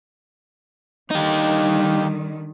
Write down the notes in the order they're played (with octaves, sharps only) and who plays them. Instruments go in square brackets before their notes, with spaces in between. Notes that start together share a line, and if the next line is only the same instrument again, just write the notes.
[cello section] D3 D#3 G3 [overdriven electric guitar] D#4 G4